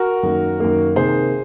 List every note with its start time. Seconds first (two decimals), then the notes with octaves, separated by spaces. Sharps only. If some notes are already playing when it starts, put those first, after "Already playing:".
Already playing: F#4 A#4
0.23 F#2 D#3 A#3
0.60 F#2 D#3 A#3
0.96 C3 D#3 A#3 G#4 C5